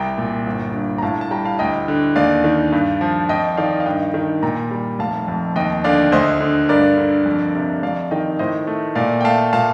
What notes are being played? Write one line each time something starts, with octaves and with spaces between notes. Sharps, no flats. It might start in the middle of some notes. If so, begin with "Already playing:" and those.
Already playing: C2 G5 A#5
A#2
G1
G2
A#5
A2 F5 A5
A5
G3 G5 A#5
F5 A5
D2 D#5 G5
D3
D#2 D5 F5
D#3
G2
F3
F2 D#5 G5
D#3 D5 F5
F5
G2 D#5 G5
D#3
A#2 G5 A#5
G3
F1 F5 A5
F2
D#2 D#5 G5
D3 D5 F5
D2 C5 D#5
D3
G2 A#4 D5
D3
F2
C3
F2 D5 F5
D#3 D#5 G5
A2 C5 D#5
A3
A#2 D5 F5
G5
A3 F5 A5
A#2 F5 A5